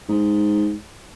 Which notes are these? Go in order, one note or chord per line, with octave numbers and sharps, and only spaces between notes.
G#2